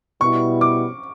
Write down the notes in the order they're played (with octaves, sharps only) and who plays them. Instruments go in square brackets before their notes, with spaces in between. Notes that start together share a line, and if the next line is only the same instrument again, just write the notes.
[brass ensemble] B2 G3 B3 E4 [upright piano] C#6
[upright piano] D6